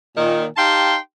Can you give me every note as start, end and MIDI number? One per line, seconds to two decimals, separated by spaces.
0.17 0.45 46
0.17 0.45 51
0.57 0.97 63
0.57 0.97 67
0.57 0.97 77
0.57 0.97 79
0.57 0.97 81
0.57 0.97 84